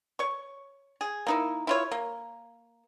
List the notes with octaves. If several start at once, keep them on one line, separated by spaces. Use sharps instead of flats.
C#5 C#6
G#4
A#3 D#4 E4
E4 F4 C#5
A#3